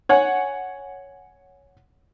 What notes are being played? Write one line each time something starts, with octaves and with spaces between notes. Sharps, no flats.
C#5 F#5 G#5